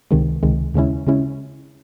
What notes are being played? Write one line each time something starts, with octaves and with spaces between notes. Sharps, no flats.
C#2 C3 D#3 G#3
C#2 C3 D#3 G#3
D#2 C#3 G#3 C#4 E4
C#3 G#3 C#4 E4